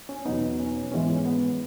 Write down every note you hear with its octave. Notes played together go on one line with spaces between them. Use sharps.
C#4
E2 B2 F#3 B3 D#4
C#4
G#2 E3 G#3 B3 C#4
B3